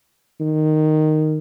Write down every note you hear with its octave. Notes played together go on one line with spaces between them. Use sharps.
D#3